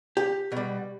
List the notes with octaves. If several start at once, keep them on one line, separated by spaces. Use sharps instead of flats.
G4
B2 G3